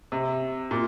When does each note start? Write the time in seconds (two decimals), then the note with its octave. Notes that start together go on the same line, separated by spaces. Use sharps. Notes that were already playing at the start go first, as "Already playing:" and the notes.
0.12 C3
0.71 A#2